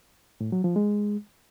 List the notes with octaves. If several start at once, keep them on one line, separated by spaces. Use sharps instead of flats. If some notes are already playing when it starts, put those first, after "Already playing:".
A2
F#3
F3
G#3